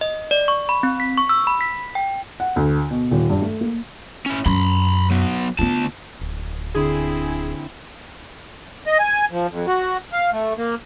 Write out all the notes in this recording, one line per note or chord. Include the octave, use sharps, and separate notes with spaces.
D#5
D5
C#6
B5
C4
B6
C#6
E6
B5
B6
G5
F#5
D2
B2
D#1
G2
A3
A#3
C#4 E4
F#2 B5 C6
F#3 B3
D2 B3 F4 A5
D1
D3 C4 E4 G#4
B6 E7
D#5
G#5
F3
F2
F#4
F5
A3
A#3